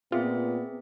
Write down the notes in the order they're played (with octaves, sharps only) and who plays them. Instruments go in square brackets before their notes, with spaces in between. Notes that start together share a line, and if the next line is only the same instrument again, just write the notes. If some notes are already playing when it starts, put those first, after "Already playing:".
[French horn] A#2 [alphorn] B3 [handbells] C4 G#4 E5 [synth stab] F4